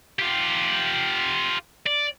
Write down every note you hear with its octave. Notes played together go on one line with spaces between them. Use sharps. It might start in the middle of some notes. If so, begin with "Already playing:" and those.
F4 G4
D5